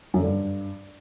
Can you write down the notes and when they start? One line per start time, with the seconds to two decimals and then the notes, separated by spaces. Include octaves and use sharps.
0.14 F#2
0.19 D3
0.24 G2